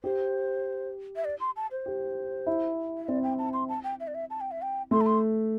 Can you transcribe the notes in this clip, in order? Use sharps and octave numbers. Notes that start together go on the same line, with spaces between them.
G4 C5
E5
D5
C6
A5
C5
G4
E4
E5
C4 D5
G5
A5
C6
A5
G5
E5
D5
E5
A5
G5
E5
G5
A3 C6
A5
C6